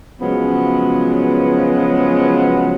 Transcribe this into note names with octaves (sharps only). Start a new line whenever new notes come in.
C#3 F3 F#3 G#3 B3